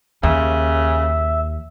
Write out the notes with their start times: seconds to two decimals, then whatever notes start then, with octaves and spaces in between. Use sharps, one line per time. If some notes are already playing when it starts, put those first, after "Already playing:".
0.23 D#2 C#3 E5